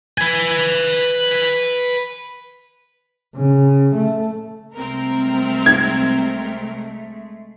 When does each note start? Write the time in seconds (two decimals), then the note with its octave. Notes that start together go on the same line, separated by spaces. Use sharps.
0.18 B4 G#5
3.36 C#3
3.95 A3
4.75 C2 G#3 A3 C4 A#4
5.66 G#6